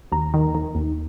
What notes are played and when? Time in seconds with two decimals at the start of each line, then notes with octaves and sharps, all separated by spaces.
0.12 D#2 A#5
0.34 D#3
0.55 D#3
0.75 D#2